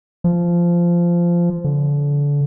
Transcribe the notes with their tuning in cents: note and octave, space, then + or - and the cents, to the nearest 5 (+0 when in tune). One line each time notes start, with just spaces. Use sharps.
F3 -15
D3 -30